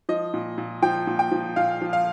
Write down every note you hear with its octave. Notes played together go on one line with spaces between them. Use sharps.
F3 D#5
A#2
A#2
F3 G5
A#2
G5
F3
A#2 F5
F3
F5